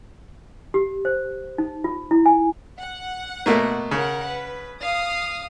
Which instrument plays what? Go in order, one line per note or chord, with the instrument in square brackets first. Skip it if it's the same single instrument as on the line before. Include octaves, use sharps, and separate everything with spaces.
[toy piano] G4
C5
D#4
F4
E4
G#5
[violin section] F#5
[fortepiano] B2 A3 A#3
[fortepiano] C#3 [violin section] A#4 F#5
[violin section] B4
F5 D#6